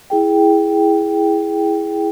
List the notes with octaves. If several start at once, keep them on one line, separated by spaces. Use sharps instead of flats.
E4 G#4 G5